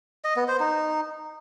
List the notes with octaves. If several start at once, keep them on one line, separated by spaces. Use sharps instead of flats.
D#5
B3
C5
D#4